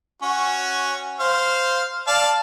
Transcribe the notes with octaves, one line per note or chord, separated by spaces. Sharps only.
C#4 F#4
C5 F5
D5 F5 A5